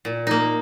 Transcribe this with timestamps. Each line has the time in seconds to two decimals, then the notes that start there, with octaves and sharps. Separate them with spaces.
0.05 A#2
0.27 A#3 D#4